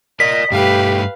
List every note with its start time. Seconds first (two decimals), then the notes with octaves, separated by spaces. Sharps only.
0.20 A#4 D5 D#5 B6
0.52 G2 A3 G4 B4 F5